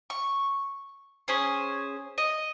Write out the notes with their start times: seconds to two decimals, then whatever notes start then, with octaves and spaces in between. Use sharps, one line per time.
0.10 C#6
1.28 C#4 G#4 C5
2.18 D#5